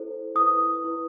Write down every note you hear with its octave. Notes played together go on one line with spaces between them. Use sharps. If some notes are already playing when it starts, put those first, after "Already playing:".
Already playing: E4 A4 C5
E4 B4 D#6
E4 B4